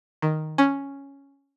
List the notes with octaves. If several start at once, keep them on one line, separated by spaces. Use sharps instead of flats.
D#3
C#4